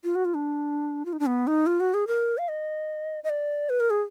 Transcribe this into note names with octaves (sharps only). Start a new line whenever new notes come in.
F4
F#4
F4
D4
F4
D#4
D4
B3
D#4
F4
F#4
G#4
A#4
F5
D#5
D#5
D5
B4
A#4
G#4